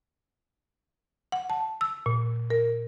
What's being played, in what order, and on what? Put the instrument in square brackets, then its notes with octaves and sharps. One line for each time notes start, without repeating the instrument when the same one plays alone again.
[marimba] F#5
A5
E6
A#2
A#4